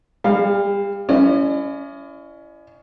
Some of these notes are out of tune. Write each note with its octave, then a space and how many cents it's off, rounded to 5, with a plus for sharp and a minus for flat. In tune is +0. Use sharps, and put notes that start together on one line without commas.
G3 +35 G#4 -20 F5 +0
C#4 +20 E4 +25 D#5 -45